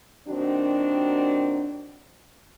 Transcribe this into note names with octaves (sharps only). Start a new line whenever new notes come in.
A#2 D#3 F#3 C4 D4 F#4